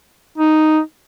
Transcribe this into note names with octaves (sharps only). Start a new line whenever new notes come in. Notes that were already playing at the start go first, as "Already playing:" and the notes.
D#4